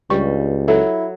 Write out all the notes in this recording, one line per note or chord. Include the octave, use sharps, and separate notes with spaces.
C#2 G2 G3 C#6
F#3 E4 A4